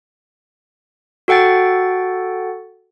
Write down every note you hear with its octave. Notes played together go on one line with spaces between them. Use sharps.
F#4 A4 F#5 G5 A6